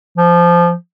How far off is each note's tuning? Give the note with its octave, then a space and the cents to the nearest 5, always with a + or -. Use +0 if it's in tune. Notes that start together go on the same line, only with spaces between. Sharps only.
F3 -15